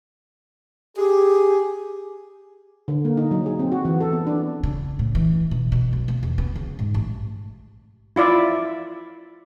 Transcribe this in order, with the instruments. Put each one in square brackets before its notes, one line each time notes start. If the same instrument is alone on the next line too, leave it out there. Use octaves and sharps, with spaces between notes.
[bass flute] G4 [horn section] G#4
[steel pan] D3
A#3
D#4
F#3
G#4
C4
F#4
E3
A4
B3
D4
[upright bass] C#3
A2
E3
B2
B2
B1
A#3
E2
B3
C#3
G#2
A1
[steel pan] E4 F4 D5 E5